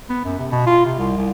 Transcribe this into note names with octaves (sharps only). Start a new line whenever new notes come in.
B3
F#2
C3
B2
F4
C3
C2
C2